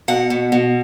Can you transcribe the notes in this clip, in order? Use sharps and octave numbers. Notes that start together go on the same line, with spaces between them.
B2 F#5
B2
B2